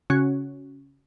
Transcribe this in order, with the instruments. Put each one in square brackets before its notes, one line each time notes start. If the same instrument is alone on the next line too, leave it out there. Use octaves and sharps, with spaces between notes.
[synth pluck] C#3 C#4 F#4